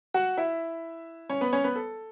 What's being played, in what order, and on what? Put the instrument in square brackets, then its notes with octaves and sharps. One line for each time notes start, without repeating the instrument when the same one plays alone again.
[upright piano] F#4 F#5
E4 E5
C#4 C#5
B3 B4
C#4 C#5
B3 B4
A4